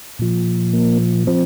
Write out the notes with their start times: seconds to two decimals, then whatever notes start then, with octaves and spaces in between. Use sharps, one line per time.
0.19 A#2 F3
0.73 A#3
1.27 F3 C4